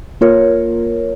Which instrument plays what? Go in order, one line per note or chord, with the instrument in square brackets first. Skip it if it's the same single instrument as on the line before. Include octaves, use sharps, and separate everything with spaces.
[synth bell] A#3 F4 A#4 C#5